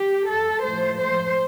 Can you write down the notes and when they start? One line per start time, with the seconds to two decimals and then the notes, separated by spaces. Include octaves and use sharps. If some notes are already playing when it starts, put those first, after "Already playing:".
Already playing: G4
0.27 A4
0.64 A2 F3 A3 C5
1.00 C5